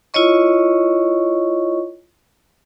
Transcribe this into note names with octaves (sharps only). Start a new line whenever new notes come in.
E4 F4 C#5 D#5 C#6